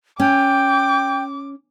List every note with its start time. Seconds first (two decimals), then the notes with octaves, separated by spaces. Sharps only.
0.20 C#4 G5 D6